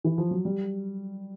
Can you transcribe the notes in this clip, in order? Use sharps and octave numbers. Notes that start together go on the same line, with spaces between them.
E3
F3
F#3
G3